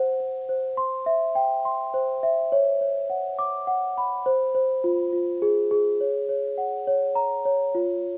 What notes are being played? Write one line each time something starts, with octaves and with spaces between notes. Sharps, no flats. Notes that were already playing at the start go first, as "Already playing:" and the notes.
Already playing: C5 F#5
C5
C5
C6
E5
G5
C6
C5
E5
C#5
C#5
F#5
D6
F#5
B5
C5
C5
F4
F4
G#4
G#4
C#5
C#5
F#5
C#5
A#5
C#5
F4